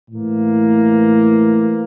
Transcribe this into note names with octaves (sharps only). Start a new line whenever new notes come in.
A2 E3 A#3